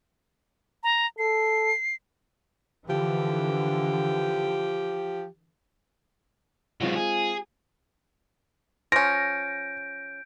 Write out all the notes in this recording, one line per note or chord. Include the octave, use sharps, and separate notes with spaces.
A#5
A4 C7
D3 E3 F3 G4
D#3 F#3 G#3 C4 F4
G#4
F3 C#4 G6 A#6 D7